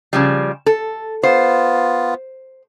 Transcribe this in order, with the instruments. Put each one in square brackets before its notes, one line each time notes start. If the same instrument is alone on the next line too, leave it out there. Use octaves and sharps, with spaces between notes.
[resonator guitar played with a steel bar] C#3 F3 G3
A4
[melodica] B3 F4 [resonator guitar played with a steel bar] C5